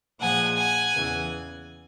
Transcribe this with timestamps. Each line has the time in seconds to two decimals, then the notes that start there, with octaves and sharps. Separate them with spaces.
0.21 A#2 F3 G#3 F#5 G#5
0.57 F#5 G#5
0.95 E2 C#3 E3